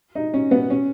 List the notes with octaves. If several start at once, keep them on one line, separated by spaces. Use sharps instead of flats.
D#4
C#4
B3
C#4